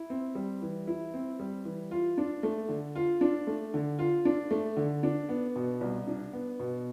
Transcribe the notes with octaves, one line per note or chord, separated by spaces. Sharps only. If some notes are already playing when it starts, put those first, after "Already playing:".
Already playing: E4
C4
G3
E3
E4
C4
G3
E3
F4
D4
A3
D3
F4
D4
A3
D3
F4
D4
A3
D3
D4
B3
B2
C2
D4
B3
B2